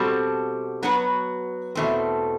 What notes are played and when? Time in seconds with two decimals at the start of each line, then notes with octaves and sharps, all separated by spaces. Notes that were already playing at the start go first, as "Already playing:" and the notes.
Already playing: B2 G3 C4 F#4 A4
0.83 F#3 B3 F#4 B4
1.75 E2 B2 A3 C4